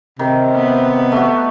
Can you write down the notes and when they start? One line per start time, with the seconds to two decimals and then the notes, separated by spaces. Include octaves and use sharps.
0.19 C3 D#3
0.55 B3
1.12 A3 F#4